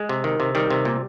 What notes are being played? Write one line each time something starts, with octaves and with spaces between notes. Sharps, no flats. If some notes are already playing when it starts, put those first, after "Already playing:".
Already playing: G#3
C3
D#3
C3
D#3 G3
C3
A#2